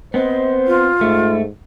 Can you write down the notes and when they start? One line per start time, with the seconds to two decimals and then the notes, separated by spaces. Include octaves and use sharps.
0.14 B3 C4 C5 D#5
0.67 F4
1.01 G#2 A3